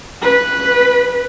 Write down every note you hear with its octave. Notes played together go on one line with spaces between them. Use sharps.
B4